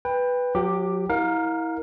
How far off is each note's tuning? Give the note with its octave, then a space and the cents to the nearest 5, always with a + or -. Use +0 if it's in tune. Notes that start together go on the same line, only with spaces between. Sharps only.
B4 +0 G5 +25
F#3 -35 G4 +0 D6 +10
E4 -25 A#4 +0 F5 +35